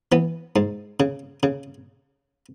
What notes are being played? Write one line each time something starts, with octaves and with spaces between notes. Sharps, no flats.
E3 B3
G#2
C#3
C#3